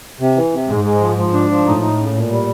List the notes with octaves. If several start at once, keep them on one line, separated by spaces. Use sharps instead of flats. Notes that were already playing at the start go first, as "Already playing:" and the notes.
C3
E3
C3
G#2 G#3
G#3
F3
F3
D4
F3
A2 D#4
D#4
C#3
A#2
G3